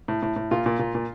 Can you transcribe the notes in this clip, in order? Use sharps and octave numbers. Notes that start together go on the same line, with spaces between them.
A2
A2
A2
A#2 F4
A#2
A#2
A#2